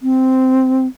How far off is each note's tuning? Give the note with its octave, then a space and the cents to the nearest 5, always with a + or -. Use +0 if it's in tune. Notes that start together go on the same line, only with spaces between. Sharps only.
C4 -5